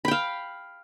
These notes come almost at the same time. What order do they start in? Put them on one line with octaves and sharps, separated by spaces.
B5 G5 F5